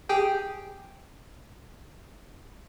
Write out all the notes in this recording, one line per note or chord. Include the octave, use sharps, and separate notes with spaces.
G4 G#4 G5